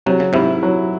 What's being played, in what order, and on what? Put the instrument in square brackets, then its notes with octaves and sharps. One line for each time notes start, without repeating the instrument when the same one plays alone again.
[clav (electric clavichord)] C3 [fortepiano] F#3
[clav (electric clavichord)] C#3
[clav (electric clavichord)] G#2 C3 [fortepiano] E4
[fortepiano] F#3